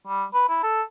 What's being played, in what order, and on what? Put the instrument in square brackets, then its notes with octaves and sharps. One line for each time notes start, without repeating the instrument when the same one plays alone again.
[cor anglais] G3
B4
E4
A4